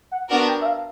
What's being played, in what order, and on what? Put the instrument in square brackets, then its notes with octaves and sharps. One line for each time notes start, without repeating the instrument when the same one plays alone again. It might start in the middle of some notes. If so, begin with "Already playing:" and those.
[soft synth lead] F#5
[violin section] B3 D4 F#4 A#4 [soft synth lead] F#5
[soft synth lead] G5
E5
F5